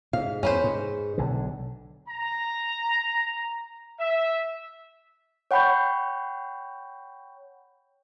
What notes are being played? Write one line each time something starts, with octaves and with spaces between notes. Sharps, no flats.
G#2 F5
E2 C#4 B4 C5
G#2
B1 D3
A#5
E5
C#5 F#5 G5 B5 C#6 G6